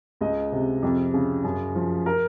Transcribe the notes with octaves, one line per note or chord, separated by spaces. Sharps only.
C#2 D#5
C3
F2
C#3
F#2
F3
A#4